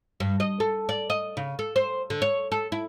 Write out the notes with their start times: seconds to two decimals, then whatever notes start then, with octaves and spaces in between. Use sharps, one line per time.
0.20 G2
0.40 D#5
0.60 A4
0.89 D5
1.10 D#5
1.37 C#3
1.59 A4
1.76 C5
2.10 D3
2.22 C#5
2.52 A4
2.72 E4